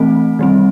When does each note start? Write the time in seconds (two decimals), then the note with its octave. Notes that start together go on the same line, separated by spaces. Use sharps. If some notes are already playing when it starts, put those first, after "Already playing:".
Already playing: E3 A3 C4
0.39 D#3 G3 C4